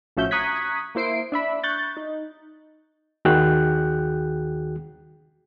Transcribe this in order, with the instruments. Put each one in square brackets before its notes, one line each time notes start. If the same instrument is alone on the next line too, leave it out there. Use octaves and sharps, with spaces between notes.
[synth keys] A1 F3 C#4 F#4 E5 G6
A#5 C#6 D#6 F#6 G#6 B6
A#3 E4 C5 C7 D7
D4 E5 B5
C#6 F#6 G6 A6
D#4
[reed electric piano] D#2 D#3 F#4 G#4 G5 F#6